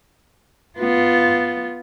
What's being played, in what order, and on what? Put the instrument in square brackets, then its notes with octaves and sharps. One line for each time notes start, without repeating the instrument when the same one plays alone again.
[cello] B3 F4